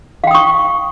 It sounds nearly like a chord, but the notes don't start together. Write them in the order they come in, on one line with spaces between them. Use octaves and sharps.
F5 G5 D#6 C#6